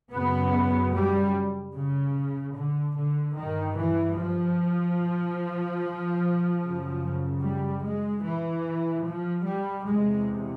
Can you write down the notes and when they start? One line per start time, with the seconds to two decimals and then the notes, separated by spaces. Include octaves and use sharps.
0.12 F#2 C#3 B3
0.93 G3
1.74 C#3
2.55 D3
2.96 D3
3.37 G2 D#3
3.77 E3
4.18 F3
6.61 F#2 C#3
7.42 G3
7.83 G#3
8.23 E3
9.05 F3
9.45 G3
9.86 E2 C3 G#3